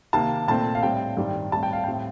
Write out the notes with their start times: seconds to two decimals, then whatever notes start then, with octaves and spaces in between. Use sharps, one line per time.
0.13 C3 D#3 A#3 A5
0.47 A#2 A3 C4 A5
0.75 F5
0.83 A2 G3 C4 G5
1.17 G2 D#3 G3 C4
1.52 A2 G3 C4 A5
1.63 G5
1.73 F5
1.84 A2 G3 C4 G5